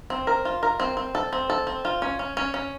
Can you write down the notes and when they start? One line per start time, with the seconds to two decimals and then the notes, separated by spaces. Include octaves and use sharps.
0.10 C4
0.27 A#4
0.45 F4
0.63 A#4
0.80 C4
0.97 C4
1.15 A4
1.33 C4
1.50 A4
1.67 C4
1.85 F4
2.02 C#4
2.19 C#4
2.37 C#4
2.54 C#4